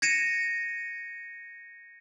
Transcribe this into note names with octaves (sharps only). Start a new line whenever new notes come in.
G#6 A#6 C#7 D#7 E7